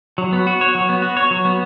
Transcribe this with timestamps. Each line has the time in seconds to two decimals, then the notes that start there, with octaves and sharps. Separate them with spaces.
0.18 F#3
0.33 B3
0.47 F#4
0.61 C#5
0.75 F#3
0.89 B3
1.02 F#4
1.17 C#5
1.31 F#3
1.45 B3